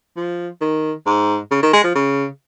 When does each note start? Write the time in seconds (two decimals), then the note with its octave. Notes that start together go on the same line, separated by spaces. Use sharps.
0.16 F3
0.61 D#3
1.06 G#2
1.51 C#3
1.63 D#3
1.73 G#3
1.84 F3
1.95 C#3